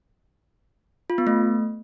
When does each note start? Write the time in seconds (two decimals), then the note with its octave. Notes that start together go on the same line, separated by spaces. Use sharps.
1.10 F4
1.18 B3
1.27 A3